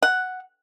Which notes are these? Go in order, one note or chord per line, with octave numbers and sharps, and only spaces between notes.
F#5